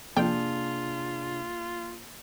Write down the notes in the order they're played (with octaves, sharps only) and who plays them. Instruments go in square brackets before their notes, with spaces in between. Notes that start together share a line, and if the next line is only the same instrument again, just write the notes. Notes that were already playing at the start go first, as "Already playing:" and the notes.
[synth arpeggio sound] F2 G5 [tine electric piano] C3 D4 G#4 [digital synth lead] A#3 [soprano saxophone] F4